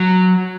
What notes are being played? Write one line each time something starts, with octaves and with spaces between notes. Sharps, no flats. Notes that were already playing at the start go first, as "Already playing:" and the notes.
Already playing: F#3